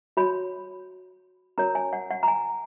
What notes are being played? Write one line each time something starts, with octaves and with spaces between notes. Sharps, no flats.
F#4 C#5 B5
C#4 F#4 A#4 C#5 A#5
G#5
F#5
F#5
A#5
G#5